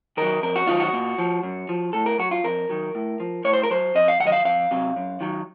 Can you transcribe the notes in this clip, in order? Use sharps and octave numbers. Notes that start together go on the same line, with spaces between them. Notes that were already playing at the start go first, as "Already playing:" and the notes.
D#3 F#3 A#4
F2 A#4
F#4
D#3 F#3 F4
F#4
A#2
F3
F#2
F3
A2 A4
A#4
F#3 F#4
F4
F2 A#4
D#3 F#3
A2
F3
A2 C#5
C5
A#4
F#3 C5
F2 D#5
F5
D#3 F#3 D#5 F#5
F5
F2 F5
C3 F#3
F#2
D#3 F#3